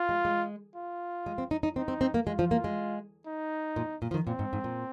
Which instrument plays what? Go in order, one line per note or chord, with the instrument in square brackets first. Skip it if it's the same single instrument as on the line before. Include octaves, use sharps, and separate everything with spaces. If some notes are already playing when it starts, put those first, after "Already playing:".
Already playing: [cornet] F4
[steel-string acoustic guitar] G#3
G#3
[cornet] F4
[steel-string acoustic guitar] G#3
C4
D#4
D#4
[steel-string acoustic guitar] C4 [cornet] D#4
[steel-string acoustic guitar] C4
C4
A#3
[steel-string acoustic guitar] G#3 [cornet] F4
[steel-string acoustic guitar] F3
A#3
G#3
[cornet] D#4
[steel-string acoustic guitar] A#2
A#2
F3
D#3
[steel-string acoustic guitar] A#2 [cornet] C4
[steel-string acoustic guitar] G#2
G#2
A#2